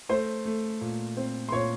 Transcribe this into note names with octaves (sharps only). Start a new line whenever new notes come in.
A3 C5 C6
A3
A#2
C4
C6
A#2 C#5 C#6